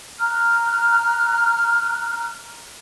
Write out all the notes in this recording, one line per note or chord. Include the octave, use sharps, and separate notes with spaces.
A#5 F6 F#6